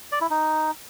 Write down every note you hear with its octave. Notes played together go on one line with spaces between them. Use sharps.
D5
E4
D#4